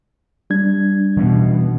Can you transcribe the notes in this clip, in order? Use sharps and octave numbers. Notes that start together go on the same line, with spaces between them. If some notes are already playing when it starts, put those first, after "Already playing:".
G3 D4 G#6
B2 E3 B3 C#4